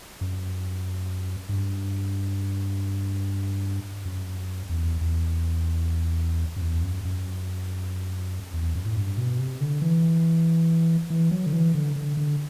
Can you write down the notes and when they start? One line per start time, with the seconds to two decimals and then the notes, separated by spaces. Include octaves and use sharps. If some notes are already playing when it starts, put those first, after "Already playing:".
0.21 F#2
1.49 G2
4.05 F#2
4.69 E2
5.01 E2
6.56 F#2
6.62 E2
6.83 F#2
7.05 F#2
8.54 E2
8.75 F#2
8.86 A2
8.97 G2
9.18 B2
9.39 C3
9.61 D3
9.82 E3
11.10 E3
11.31 F#3
11.46 D3
11.53 E3
11.74 D3
11.96 D3
12.17 D3